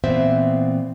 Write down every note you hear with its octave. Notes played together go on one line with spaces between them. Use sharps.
A#2 E3 B3 C4 C5 E5